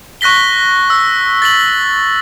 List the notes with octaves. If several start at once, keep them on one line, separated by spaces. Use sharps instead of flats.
C#6 F#6 A#6 B6 G7
E6
A6 B6 F#7